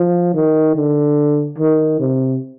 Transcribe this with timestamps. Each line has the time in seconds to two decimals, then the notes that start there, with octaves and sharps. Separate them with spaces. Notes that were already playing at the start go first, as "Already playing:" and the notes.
Already playing: F3
0.34 D#3
0.75 D3
1.58 D#3
2.00 C3